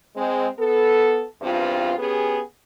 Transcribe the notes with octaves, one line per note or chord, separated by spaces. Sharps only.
G#3 C4
B3 A4
E2 G2 C4 F4
B3 C#4 G4 G#4